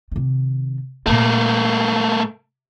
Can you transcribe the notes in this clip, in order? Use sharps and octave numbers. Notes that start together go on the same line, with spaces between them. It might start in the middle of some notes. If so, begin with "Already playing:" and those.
C3 D#3
A#2 A3 A#3 D4